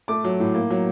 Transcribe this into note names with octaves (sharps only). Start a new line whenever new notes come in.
A3 D6
F#3
A2
A#3
F#3